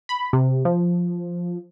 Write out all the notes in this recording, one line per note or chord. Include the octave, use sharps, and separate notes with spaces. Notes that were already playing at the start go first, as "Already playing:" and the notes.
B5
C3
F3